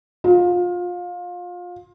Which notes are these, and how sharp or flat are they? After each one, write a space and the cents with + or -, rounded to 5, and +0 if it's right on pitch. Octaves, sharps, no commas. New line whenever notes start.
F4 +25